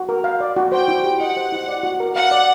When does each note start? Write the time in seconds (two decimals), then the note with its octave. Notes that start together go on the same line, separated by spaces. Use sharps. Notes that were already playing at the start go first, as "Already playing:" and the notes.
Already playing: F#4
0.09 A#4
0.24 F5
0.40 D5
0.56 F#4
0.72 C5 G5
0.88 E4
1.04 G4
1.20 D#5 F#5
1.37 C5
1.52 E4
1.68 D5
1.83 F#4
2.00 A#4
2.16 F5 F#5
2.31 D5